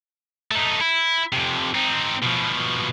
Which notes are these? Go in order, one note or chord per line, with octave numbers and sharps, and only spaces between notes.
A3 D#4
E4
F2 C3
C4 D#4
B2 F3